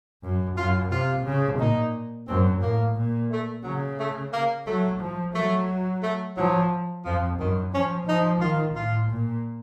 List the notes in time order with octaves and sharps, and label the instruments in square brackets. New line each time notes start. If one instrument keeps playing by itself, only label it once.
[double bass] F#2
[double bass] F#2 [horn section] F4
[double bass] C3 [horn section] F4
[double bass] C#3
[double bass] A#2 [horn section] D#4
[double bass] F#2 [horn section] C4
[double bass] A2 [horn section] A#3
[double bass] A#2
[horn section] A3
[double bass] C#3 [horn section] F#3
[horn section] A3
A#3
[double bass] F#3 [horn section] A3
[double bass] F3
[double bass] F#3 [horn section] A3
[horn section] A3
[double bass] F3 [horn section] F#3
[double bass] F2 [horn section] F3
[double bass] F#2 [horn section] D#3
[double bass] F3 [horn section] C#4
[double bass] F3 [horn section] D#4
[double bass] D#3 [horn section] F4
[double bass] A2 [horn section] F4
[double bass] A#2